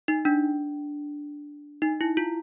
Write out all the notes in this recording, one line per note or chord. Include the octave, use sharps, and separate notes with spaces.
D#4
D4
D#4
E4
F4